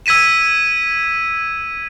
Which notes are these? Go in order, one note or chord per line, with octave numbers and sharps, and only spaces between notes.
E6 G#6 B6 D#7 E7